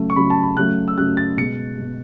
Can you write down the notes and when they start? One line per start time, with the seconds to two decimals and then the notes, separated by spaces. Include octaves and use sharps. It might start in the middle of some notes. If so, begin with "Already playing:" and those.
Already playing: C#3 F#3 A3
0.10 C#6
0.16 C#3 F#3 A3 B5
0.30 A5
0.43 B5
0.57 C#3 F#3 A3 F#6
0.88 E6
0.98 C#3 F#3 A3 F#6
1.17 A6
1.37 B2 G#3 C#7
1.78 B2 G#3